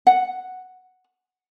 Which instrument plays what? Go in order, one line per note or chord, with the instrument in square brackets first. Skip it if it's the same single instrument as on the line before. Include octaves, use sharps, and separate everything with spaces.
[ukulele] F#5